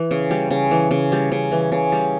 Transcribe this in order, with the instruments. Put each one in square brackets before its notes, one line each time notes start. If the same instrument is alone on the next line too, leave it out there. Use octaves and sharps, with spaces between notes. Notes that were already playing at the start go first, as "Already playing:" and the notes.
Already playing: [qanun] E3
C#3
G3
C#3
E3
C#3
G3
C#3
E3
C#3
G3